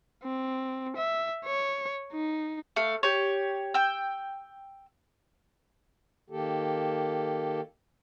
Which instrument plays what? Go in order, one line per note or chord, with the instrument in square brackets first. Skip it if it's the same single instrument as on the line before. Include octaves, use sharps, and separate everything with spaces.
[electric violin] C4
E5
C#5
D#4
[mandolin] A3 F5
G4 C#5
G5 E6
[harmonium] D#3 A#3 G4 A4